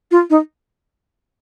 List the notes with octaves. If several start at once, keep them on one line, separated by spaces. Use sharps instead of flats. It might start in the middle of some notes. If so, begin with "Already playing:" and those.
F4
D#4